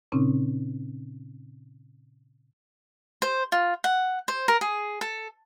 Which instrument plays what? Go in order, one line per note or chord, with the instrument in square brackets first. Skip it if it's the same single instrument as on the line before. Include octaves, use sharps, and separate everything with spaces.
[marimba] A#2 C#3 C4 C#4 D#4
[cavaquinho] C5
F4
F#5
C5
A#4
G#4
A4